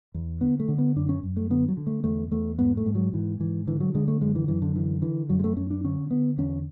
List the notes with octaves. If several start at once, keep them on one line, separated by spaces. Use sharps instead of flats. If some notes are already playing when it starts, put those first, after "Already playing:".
E2
D3 B3
A3
D3
B3
F#2 D4
C#4
F#2
A3
D3 B3
F#3
D3
A3
E2 A3
E2 A3
G#2 B3
A3
G#2
F#3
G#2 E3
G#2 E3
D3 E3
F#3
D3 G#3
A3
F#2 G#3
E3
F#2 E3
D3
D3 E3
D3 E3
F#2 F#3
G#3
A3
F#2 C#4
D4
D3 C#4
D3 B3
E2 C#4